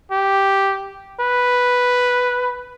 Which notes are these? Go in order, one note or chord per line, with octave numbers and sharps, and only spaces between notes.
G4
B4